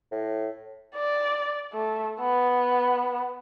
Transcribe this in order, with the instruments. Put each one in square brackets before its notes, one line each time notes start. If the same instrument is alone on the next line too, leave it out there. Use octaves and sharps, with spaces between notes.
[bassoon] A2
[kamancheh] D5
A3
B3